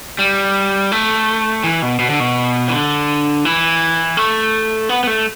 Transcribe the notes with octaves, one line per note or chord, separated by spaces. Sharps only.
G3
A3
E3
B2
B2
D3
B2
E3
D3
E3
A3
B3
B3
A3